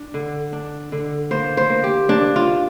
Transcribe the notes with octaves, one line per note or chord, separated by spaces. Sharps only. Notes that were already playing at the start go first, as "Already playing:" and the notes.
Already playing: D4
D3
D4
D3
A#3 C5
C5
A#3
G4
A#3 D4
F4